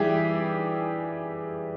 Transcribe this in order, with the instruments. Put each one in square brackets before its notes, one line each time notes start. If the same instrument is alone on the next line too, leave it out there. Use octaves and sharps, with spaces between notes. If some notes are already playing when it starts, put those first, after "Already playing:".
Already playing: [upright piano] E3 G3 E4 G4 G#4